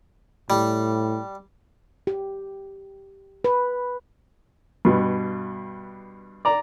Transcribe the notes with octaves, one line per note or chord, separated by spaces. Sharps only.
A2 G3
G4
B4
G2 B2
D5 A#5